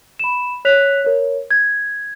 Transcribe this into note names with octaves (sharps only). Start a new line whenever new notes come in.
B5 E7
C#5 F#6 B6 F7
A#4 C#5
G#6